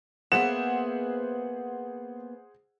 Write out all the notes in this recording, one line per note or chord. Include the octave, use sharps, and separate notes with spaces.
A#3 B3 G#4 C5 E5 F#5 E7